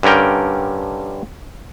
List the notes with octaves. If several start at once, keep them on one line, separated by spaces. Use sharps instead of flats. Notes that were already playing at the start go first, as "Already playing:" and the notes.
G2 D3 C#4 A#4 G5